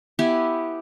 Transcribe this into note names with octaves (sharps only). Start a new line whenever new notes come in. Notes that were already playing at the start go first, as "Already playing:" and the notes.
B3 E4 G4 G#5